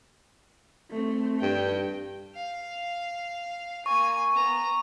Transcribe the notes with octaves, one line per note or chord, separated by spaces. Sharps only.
A3 C4
G2 G5
F5
A#3 G#5 C#6
B3 A#5